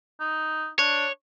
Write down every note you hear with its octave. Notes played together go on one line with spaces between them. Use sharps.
D#4
D4 C#5